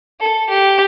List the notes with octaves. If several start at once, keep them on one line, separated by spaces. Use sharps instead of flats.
A4
G4